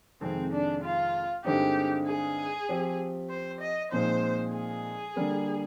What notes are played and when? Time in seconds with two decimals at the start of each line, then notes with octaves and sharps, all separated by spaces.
0.21 F2 C3 D#3 G#3 C4
0.53 D4
0.83 F4
1.45 G2 D3 G#3 C4 D#4 G4
2.07 G#4
2.69 F3 C4 G4
3.30 C5
3.61 D#5
3.92 A#2 F3 G#3 C4 D#4 C5
4.53 G#4
5.16 D3 G3 A#3